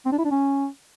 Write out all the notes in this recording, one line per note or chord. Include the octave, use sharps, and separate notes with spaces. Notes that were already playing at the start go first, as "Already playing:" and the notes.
C4
D4
E4
D4
C#4